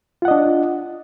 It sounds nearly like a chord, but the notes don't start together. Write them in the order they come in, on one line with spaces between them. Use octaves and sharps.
F4 F#5 D#5 D4